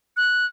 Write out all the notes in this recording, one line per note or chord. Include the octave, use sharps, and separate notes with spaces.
F#6